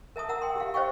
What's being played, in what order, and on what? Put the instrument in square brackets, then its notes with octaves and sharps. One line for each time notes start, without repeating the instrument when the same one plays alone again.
[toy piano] A#4 E5 A5 D#6
A#4 F#5 A#5 E6
G5 C6
G4 E5 F5
C5 C#5 D#5 F5 G5 C#6